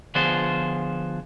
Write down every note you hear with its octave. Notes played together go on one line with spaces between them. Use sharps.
D3 F3 B3 F4 G#4 C5